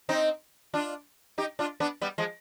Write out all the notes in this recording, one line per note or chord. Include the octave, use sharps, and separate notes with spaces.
C4 D#4
D4 F4
D#4 G4
D4 F4
B3 D4
G3 B3
F3 G#3